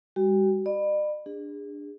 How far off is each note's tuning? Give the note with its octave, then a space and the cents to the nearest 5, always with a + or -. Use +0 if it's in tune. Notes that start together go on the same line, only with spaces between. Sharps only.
G3 +45 F#4 +45
D5 +45 B5 +0
D4 +0 G#4 -35